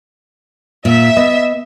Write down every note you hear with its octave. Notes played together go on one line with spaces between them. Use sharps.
A#2 E5
B3 D#5